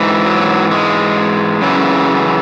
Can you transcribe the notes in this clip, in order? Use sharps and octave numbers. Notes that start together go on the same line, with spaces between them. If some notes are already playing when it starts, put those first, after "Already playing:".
Already playing: G#2 E3
F#3
G#3
F#2 C#3 E3